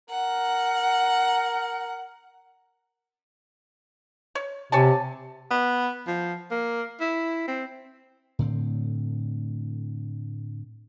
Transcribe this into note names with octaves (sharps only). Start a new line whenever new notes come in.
A#4 F#5
C#5
C3 C#5 G#5 A5
B3
F3
A#3
E4
C4
A2 D3 C4